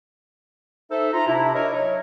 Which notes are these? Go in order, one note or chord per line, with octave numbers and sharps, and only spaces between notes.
D#4 A4 C5 E5
F4 A#5
C3 D4 E4
A#4 C#5 D#5
F#3 C#5